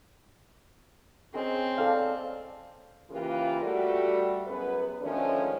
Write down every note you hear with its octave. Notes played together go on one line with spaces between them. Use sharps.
G#3 C4 C#4 A#4
A4 D5 F5 A5
C#3 E3 A#3 F4 G4 B4
G3 A3 F#4
F#2 B3 G#4 B4
D3 D#3 F3 G#3 A3 C#4